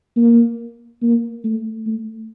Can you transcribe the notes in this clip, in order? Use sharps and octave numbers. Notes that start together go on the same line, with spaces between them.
A#3
A#3
A3
A3